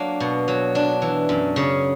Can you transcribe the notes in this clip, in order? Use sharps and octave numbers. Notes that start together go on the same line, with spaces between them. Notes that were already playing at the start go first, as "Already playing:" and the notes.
Already playing: F#3 A#3 D4
B2
F#3
D4
E3
F#2
C#3